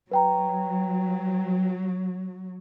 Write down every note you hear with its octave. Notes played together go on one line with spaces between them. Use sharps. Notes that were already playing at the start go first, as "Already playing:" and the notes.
F#3 B4 G5 A#5